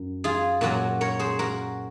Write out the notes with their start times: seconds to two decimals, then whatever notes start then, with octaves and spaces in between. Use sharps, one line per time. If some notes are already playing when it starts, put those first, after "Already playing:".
Already playing: F#2
0.24 F4 G#4
0.61 A#2 F#3 C#4 F#4 A#4
1.01 A#4 C#5
1.19 G#4 C5
1.39 F#4 A#4